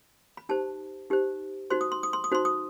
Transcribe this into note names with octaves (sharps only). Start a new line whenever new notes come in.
B5
D#4 G4 C5 A5
D#4 G4 C5
D#4 F#4 C5 C6
D#6
C6
D#6
C6
D#6
D#4 F#4 C5 C6
D#6